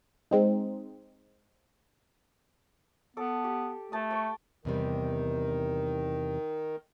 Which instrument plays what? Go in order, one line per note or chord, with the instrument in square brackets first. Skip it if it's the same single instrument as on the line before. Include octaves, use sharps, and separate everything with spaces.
[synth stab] G#3 C4 D#4
[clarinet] B3 [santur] A4 D6
[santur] G4
[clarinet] A3 [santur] A5 D#6
[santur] G5 C#6
[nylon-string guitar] E2 C3 G3 [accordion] D#3